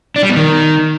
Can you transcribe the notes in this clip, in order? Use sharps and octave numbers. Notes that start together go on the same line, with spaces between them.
D4
G3
B2
D#3